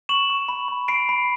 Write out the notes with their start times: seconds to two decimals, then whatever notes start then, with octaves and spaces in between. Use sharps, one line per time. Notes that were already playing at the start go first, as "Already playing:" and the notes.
0.09 C#6 E7 F#7
0.30 C#6
0.48 B5
0.68 B5
0.88 B5 C7 D7
1.09 B5